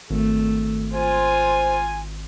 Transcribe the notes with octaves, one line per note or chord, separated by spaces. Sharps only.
G#1 A3
F4 C5 G#5